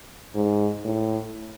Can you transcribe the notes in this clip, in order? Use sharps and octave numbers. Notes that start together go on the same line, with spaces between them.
G#2
A2